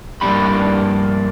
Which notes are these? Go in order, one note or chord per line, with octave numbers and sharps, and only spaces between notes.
G2 A#3 D4 G4 B5